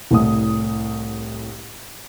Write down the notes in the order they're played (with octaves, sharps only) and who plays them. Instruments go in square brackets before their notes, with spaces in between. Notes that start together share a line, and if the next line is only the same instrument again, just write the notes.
[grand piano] C2 A2 D#6